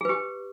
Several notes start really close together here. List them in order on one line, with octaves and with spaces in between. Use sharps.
G#4 B4 G4